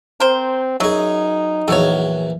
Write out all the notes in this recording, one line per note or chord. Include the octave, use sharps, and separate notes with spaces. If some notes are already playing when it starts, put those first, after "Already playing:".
C4 A#4 C5
F#2 F#3 D#4 G#4
A#1 E2 F#3 A3 C#5